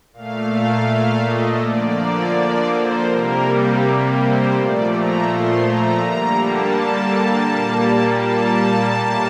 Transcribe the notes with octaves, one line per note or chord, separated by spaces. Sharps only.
A#2 A3 F5
F5
F5
D#5
D3 F3 A#3 D5
D5
D5
C5
C3 G3 A#3 A#4
G4
C5
A#2 F3 A3 D5
A#5
C6
A#5
D3 G3 A#3 A#5
A5
A#2 G3 A#3
A5
A2 G3 A#3